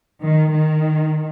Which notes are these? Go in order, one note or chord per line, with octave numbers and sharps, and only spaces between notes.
D#3
D#3